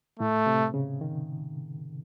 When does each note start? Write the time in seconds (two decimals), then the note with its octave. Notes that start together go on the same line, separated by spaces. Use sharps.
0.19 A2 A3
0.47 C3
0.74 C#3
1.01 D#3